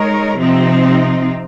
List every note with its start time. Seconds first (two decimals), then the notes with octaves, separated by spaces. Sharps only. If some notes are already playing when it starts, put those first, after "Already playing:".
Already playing: G#3 D#4 A#4 C#5
0.36 C3 F3 C4 D#4